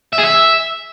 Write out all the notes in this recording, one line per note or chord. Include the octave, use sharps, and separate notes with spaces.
E5
G#4
E5